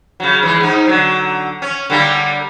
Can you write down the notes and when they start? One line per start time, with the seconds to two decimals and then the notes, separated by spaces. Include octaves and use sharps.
0.20 C#3 F#3
0.43 E3 G#3
0.60 G#2 D#4
0.87 D3 F#3
1.62 C#4
1.90 D3 G3 A#3